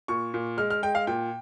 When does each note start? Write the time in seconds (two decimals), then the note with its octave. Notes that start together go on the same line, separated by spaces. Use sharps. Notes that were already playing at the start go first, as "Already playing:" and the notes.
0.08 A#2 C#6
0.34 A#2
0.58 G#3 F6
0.70 F6
0.82 G#3 G5
0.95 F5
1.07 A#2 G5